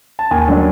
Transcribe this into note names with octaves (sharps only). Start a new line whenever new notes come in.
A5
D#2 G#5
D3 F#3 A3 D4